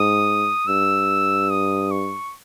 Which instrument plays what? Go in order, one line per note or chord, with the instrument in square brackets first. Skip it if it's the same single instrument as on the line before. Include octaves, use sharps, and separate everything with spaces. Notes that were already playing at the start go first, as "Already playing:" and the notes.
Already playing: [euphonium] G#2 [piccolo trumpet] D#6
[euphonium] G2 [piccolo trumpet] E6
[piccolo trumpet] D#6
C#6